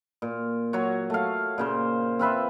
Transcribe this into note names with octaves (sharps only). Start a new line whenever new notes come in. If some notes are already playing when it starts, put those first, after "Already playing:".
A#2
F#3 F#4 C#5
A3 F5
A#2 C#3 C5
C4 F4 B4 E5